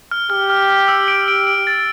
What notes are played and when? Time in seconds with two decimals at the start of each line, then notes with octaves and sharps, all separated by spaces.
0.11 F6
0.30 G4 F6
0.50 F6
0.69 F6
0.88 E6
1.08 D7
1.28 D7
1.47 D7
1.67 A6